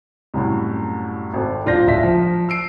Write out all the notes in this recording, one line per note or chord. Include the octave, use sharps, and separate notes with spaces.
C2 F#2 A2
G#1 C4 A4
D#1 D4 F4 C5 G6 A#6
D1 A#1 F4 E5 B6
F3
E6 C7 D7